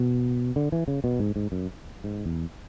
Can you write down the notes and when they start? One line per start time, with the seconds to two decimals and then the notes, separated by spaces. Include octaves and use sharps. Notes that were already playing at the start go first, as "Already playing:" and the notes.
Already playing: B2
0.56 D3
0.72 E3
0.88 C#3
1.04 B2
1.20 G#2
1.36 G#2
1.52 F#2
2.04 G#2
2.25 E2